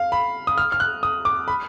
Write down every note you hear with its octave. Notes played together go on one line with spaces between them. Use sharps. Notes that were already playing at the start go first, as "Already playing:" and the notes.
Already playing: F5
B5
D#6
F6
F6
F#6
D#6
D6
B5